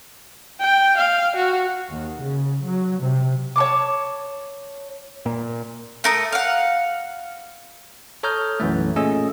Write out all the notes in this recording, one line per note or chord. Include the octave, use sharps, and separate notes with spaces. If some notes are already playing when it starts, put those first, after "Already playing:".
G5
F5
F#4
D#2
C#3
F#3
C3
C#5 A5 D6
A#2
A3 A#4 D#6
F5 F#5
A4 C#5 A#5 D#6 F6 G6
B1 F#2 E3 A3
A#2 A3 C#4 G#4 D#5 E6